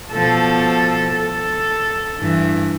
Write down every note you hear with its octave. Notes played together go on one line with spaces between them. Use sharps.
B2 F3 A4
A4
G2 E3